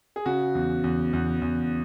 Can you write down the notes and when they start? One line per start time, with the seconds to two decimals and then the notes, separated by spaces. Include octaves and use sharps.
0.16 G#4
0.26 C#3 F#4
0.55 E2
0.84 E2
1.13 E2
1.42 E2